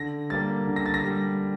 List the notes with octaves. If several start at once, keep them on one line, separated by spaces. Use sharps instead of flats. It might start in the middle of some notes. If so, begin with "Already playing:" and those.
Already playing: D3 A#6
G3 A#3 A6
D3
A#6
A6
A#6
G3